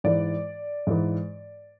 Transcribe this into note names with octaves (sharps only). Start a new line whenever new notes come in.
G#2 E3 D5
G#2 E3